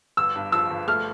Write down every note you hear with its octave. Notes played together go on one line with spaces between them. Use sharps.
G1 E6
G2
F3 E6
G1
A3 F6